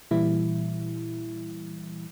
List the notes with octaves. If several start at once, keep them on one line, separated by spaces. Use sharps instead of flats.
A#2 E3 G3 E4